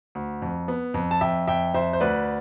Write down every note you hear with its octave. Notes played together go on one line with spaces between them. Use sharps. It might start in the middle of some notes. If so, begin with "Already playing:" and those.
D2
F2
B3
F2
A5
F2 E5 G5
F2 E5 G5
F2 C5 E5
C5
D2 B4 D5